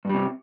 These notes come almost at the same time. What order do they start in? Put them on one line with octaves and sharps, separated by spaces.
G2 G3 C3